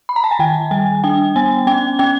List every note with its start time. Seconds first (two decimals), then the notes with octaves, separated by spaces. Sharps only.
0.09 B5
0.16 A#5
0.24 A5
0.31 G#5
0.39 D#3 G5
0.71 G3 G#5
1.04 D4 G5
1.36 B3 G#5
1.67 C#4 G5
1.99 C#4 G5